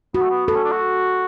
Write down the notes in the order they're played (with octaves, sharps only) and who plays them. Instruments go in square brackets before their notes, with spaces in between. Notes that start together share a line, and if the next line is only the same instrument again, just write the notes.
[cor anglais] B3 [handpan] F#4
[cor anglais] A3
B3
[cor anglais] B3 [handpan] A4
[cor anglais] C#4
D4
F#4